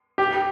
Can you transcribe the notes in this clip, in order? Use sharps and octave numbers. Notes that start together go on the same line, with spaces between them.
G4